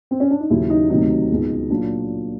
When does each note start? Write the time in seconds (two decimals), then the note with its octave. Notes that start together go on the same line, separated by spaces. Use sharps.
0.11 C4
0.20 C#4
0.30 D4
0.40 D#4
0.50 D#2 C#3 F#3 E4
0.70 D#4
0.90 D2 C3 D#3 F#3 D#4
1.29 C#2 B2 G#3
1.70 A#2 F#3 A#3 D4